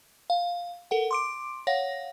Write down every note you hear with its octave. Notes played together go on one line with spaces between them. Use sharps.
F5
A4 A#4 F#5
C6 D6 D7
C#5 F5 F#5 A#6